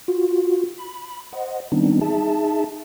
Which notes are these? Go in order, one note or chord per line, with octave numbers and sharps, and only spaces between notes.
F4 F#4
B5
C5 D#5 F#5
D#3 G3 B3 C4 D4 D#4
D#4 G#4 E5 A5